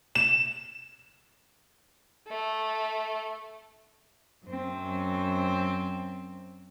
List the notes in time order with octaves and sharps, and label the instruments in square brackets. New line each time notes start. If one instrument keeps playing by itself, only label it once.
[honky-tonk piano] E7
[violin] A3
[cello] F#2 C4